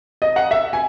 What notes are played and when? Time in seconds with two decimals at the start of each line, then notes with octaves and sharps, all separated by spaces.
0.22 D#5
0.36 F#5
0.51 E5
0.73 G#5